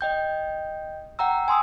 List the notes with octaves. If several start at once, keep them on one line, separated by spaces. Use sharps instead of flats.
D#5 G5 G6
F#5 G5 A#5 E6
G#5 C6 D#6 E6